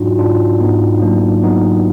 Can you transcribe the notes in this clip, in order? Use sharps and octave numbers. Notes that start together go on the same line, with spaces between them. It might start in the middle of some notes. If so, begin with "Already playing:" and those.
Already playing: G#2 F#3 D4 D#4 F4 F#4
G#2 D4 F4
G#2 B3 D#4
D#4
F#3 A#3 D4
F#3 B3 D#4